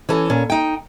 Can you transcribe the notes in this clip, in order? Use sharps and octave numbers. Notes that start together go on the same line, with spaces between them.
E3 C#4 A4
A#2 C#4
D#4 G5